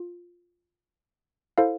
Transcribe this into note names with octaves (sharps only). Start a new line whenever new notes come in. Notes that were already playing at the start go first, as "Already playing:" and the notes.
Already playing: F4
E4 A4 C5 F5